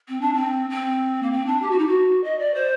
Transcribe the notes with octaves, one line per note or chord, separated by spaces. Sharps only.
C4
D4
C4
C4
A#3
C4
D4
G4
F#4
D#4
F#4
D#5
D5
C5